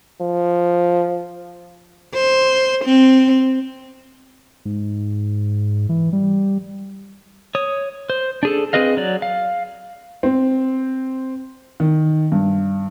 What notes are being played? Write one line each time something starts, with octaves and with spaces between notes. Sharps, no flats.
F3
C5
C4
G#2
E3
G3
C#5 D#6
C5
D4 G#4 A4
C4 G#4 B4 D#5 F5
F#3 D5
F5
C4
D#3
G2